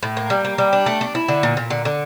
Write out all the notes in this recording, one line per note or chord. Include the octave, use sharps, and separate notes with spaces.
A2
A#3
G3
A#3
G3
D4
A3
D4
E4
D3
A#2
A#2
D3
D3